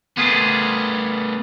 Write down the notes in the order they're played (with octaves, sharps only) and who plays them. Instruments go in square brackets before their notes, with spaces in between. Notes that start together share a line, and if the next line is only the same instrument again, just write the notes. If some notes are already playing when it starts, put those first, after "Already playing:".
[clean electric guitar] G3 F4 G#4 [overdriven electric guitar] A3 B3